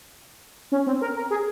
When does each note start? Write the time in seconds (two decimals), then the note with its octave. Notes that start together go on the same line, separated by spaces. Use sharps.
0.72 C#4
0.87 C4
1.01 A#4
1.16 A#4
1.30 G#4